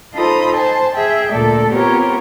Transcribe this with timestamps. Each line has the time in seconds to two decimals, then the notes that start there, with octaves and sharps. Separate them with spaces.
0.13 D#4 F4 A4 C5 B5 D#6
0.54 C5 G#5 A5
0.94 G#4 E5 G5
1.32 D2 A#2 A4 D5
1.71 B3 C4 F4 G4 A#4 C#5